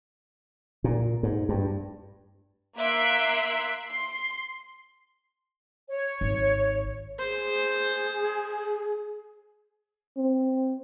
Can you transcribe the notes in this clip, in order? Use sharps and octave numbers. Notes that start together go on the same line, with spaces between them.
A#2
G#2
G2
A#3 E5 C6 F#6 B6 D7
C6 C7
C#5
G#1
G#4 C5
C4